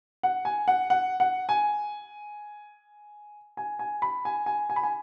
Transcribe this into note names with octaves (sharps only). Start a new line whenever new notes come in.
F#5
G#5
F#5
F#5
F#5
G#5
G#5
G#5
B5
G#5
G#5
G#5
B5
G#5